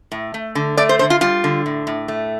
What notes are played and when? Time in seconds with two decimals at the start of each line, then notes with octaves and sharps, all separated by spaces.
0.12 A2
0.34 A3
0.55 D3
0.77 A3 D5
0.89 C5
0.99 D3 C5
1.10 F4
1.21 G3 F4
1.44 D3
1.66 A2
1.87 A2
2.08 A3